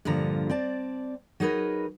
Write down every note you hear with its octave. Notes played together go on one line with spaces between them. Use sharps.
G2 A#2 D3 F3 A#5
C4 D5 A5
F#3 D#4 G#4 A#4 B4